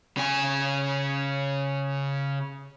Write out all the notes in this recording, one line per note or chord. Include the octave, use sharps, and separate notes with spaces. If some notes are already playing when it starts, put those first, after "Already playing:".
C#3 G#5